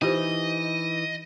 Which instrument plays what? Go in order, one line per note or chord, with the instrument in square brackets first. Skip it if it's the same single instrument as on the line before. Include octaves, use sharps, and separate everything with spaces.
[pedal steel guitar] E3 D#4 [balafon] F4 G4 C5 [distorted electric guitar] D#5